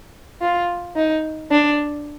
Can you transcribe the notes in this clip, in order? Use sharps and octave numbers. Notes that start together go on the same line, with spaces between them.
F4
D#4
D4